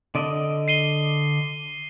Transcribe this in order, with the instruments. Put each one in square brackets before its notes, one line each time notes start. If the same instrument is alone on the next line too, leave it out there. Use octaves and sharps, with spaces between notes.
[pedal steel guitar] D3 D5 D#5
[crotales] C7 D#7 G7